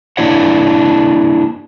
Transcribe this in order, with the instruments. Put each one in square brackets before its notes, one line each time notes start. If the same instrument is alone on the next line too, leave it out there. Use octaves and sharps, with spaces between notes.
[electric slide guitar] A#3 D4 E4 C#5 F#5